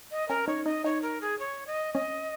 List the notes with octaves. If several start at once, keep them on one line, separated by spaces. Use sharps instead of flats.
D#5
C#4 A#4
D#4 C#5
D#4 D#5
D#4 C#5
A#4
G#4
C#5
D#5
C#4 D#5